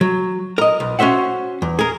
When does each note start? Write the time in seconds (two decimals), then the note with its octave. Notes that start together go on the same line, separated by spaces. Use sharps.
0.01 F#3
0.58 A#4 D#5
0.80 B1
0.99 C#4 F#4 C5 E5 F#5
1.62 E2
1.79 G#4 A#4